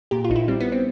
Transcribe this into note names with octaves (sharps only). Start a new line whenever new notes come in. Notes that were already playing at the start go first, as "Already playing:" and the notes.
A#2 G4
F4
A#1 D#4
E4
G3 C4
B3
C4